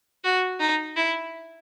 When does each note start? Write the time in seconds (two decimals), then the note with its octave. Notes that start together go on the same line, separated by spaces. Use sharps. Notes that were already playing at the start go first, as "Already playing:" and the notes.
0.24 F#4
0.60 D#4
0.97 E4